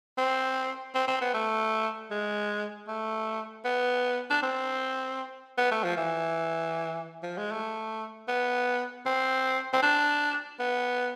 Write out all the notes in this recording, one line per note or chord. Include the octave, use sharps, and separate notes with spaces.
C4
C4
C4
B3
A3
G#3
A3
B3
D4
C4
B3
A3
F3
E3
F3
G#3
A3
B3
C4
C4
D4
B3